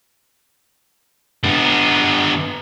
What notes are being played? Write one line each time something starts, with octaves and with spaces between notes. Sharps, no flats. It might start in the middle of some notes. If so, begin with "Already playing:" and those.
D3 B3